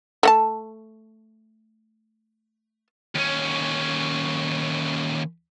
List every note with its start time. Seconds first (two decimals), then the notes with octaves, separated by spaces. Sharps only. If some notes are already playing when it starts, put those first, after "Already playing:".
0.23 A3 F#5 A5
3.15 D#2 C#4